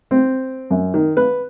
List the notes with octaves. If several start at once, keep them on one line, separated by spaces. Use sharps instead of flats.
C4
F#2
D#3
B4